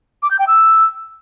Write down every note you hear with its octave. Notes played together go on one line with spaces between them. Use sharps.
D6
G6
G5
E6